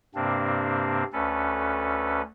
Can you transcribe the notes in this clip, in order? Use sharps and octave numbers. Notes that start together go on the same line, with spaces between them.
G2 C3 A#3 C4 D4
D2 C#4 A4 B4